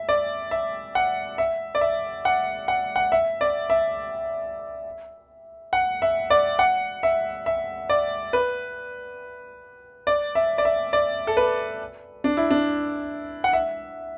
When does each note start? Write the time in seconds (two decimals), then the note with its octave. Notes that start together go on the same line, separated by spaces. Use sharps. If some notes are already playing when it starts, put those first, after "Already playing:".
Already playing: E5
0.09 D5
0.51 E5
0.95 F#5
1.38 E5
1.75 D5
1.81 E5
2.25 F#5
2.68 F#5
2.96 F#5
3.12 E5
3.41 D5
3.70 E5
5.73 F#5
6.02 E5
6.30 D5
6.59 F#5
7.03 E5
7.46 E5
7.89 D5
8.33 B4
10.07 D5
10.35 E5
10.58 D5
10.65 E5
10.93 D5
11.27 A4
11.37 B4
12.24 D4
12.37 E4
12.51 D4
13.44 F#5
13.53 E5